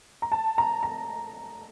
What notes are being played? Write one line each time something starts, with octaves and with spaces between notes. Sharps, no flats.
A#5
A5
A#5
A#5